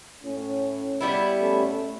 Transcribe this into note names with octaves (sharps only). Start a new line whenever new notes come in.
A2 C#4
G3 B3 E4
A2 A3 C#4